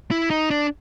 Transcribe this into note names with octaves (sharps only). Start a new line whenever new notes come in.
E4
D#4
D4